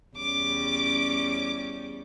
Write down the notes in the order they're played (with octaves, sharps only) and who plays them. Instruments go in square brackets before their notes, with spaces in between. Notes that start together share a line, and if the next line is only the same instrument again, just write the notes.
[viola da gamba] E2 G3 C#4 [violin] D6